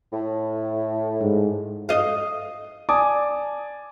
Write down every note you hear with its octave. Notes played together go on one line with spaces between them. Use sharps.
A2
G#2
D#5 F5
D5 G#5 A5 D6 D#6